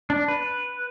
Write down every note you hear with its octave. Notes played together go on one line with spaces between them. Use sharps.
D4
B4